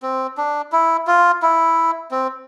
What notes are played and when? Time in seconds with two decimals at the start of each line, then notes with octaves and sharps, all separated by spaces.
0.03 C4
0.37 D4
0.72 E4
1.07 F4
1.42 E4
2.11 C4